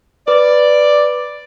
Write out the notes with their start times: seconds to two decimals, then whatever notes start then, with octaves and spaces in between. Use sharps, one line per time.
0.28 B4 D5